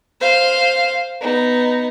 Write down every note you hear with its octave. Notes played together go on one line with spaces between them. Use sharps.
C5 F5
B3 D#4